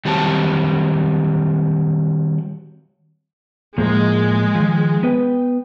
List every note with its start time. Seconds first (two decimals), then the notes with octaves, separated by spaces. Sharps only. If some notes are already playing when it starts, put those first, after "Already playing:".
0.05 D#3 F#3 G3 C4 F#4 A5
3.78 A2 F3 G#3 A#3
4.55 D#3 F3
5.03 B3 B4 G5